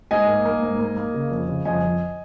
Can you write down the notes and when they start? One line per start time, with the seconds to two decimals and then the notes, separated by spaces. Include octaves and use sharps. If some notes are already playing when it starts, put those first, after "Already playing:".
0.11 G#2 D#5 G#5
0.27 A#3
0.45 A#3
0.63 G#2
0.80 A#3
0.97 A#3
1.14 C#3
1.31 F2
1.48 C#3
1.65 F2 D#5 G#5
1.83 F2